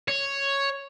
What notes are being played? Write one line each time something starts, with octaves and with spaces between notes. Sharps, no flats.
C#5